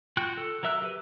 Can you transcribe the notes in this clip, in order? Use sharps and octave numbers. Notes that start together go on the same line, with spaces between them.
F4 F#4 G5 F#6
A4
F#3 A#4 E5 E6 F#6
G4 B4